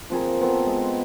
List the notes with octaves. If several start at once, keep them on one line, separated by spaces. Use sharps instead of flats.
F3 C4 G#4 A#4
B3 C4 A4 C5
G#3